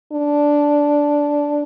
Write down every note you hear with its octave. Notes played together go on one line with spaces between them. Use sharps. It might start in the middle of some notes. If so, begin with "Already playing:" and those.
D4